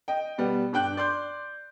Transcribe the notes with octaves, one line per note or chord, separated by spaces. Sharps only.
D#5 G5
B2 G3 B3
G2 D4 G5 F#6
D5 C6 G6